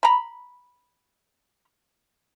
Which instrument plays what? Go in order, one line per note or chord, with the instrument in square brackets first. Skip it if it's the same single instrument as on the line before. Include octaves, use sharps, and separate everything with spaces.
[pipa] A#5 B5